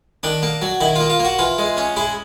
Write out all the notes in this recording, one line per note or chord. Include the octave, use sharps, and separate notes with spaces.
D#3 D4
A#3
F#3
D#3 E4
A#3 F4
F4
A#3
F#4
E3 F4
G#3
C#4
G#3 E4